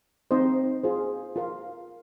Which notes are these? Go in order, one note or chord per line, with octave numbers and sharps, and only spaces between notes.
C4 D#4 C5 D#5
F4 G#4 C5
F4 A#4 F5